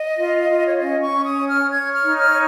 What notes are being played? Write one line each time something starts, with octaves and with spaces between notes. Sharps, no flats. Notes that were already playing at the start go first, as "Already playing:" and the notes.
Already playing: D#5
F4
F4
C#5
C#4 D#5
C#6
C#4
D#6
C#5
F6
C#5 G#6
F6
D#4
F6
C#5